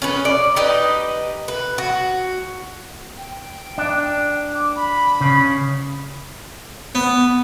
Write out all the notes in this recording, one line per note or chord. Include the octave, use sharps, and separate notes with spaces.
C#4 G#4 B4
D5
D#4 G4 B4 D#5
B4
F#4
G5
D4
D6
B5
C#3
B3